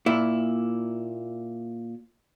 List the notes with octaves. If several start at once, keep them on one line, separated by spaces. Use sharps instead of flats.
A#2 E4